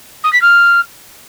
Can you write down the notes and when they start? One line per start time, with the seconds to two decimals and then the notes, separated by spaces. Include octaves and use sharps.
0.24 D#6
0.33 B6
0.41 F6